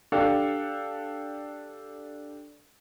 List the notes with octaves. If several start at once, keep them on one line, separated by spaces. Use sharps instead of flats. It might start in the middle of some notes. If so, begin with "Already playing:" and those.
D4 G4 A4 F5